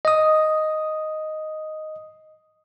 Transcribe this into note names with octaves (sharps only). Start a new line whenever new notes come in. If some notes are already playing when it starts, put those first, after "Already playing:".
D#5 D#6